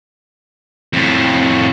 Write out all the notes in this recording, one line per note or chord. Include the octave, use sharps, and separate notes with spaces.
F2 A2